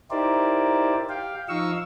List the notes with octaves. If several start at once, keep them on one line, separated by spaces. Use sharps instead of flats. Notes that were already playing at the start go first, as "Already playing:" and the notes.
D#4 E4 G4 A#4 C5 D5
G4 F5 G5
F3 D#4 D#5 F5 C#6 E6